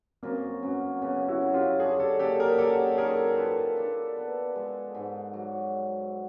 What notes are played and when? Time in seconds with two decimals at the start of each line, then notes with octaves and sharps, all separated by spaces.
0.23 F#2 A#3 C4
0.63 F#3 B3 C#4
1.02 C#3 B3 C#4
1.28 E4 F#4
1.41 F#2
1.54 F4 G4
1.80 D4 F#4 G#4
2.00 G4 A4
2.19 A#3 G4 A4
2.39 G#4 A#4
2.58 F#3 G4 A4
2.98 D#3 G#4 A#4
3.37 F4 A4 B4
3.77 D4
4.16 B3
4.56 G#3
4.95 G#2
5.34 F#3